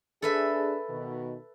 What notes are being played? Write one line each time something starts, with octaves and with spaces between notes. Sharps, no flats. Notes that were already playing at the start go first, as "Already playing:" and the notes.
D4 G#4 A4 B4 E5
B2 D#3